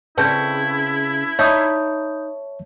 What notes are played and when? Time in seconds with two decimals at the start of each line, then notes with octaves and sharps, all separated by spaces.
0.18 C#3 C4 E4 B4 A5 G6
1.39 D#4 C#5 E5 A5 B5 D#6 G6